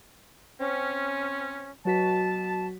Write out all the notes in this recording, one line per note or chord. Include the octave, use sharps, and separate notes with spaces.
C4 C#4
B2 F#3 F#4 A5 B6